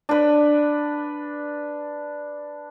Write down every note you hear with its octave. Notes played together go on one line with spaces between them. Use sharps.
D4 B4